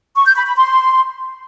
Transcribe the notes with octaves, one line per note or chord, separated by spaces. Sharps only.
C#6
G6
B5
B5
C6